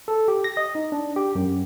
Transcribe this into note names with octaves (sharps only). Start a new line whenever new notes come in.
A4
G4
A#6
D#5
D#4
D4
G4
F#2